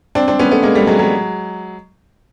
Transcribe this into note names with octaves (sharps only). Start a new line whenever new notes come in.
C4 D4
C4 D4
B3 C#4
A3 B3
G#3 A#3
G3 A3
F#3 G#3
F#3 G#3